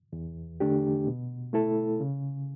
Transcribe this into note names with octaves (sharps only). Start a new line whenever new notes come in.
E2
D3 A3 D4 G4
B2
A3 E4 A4
C#3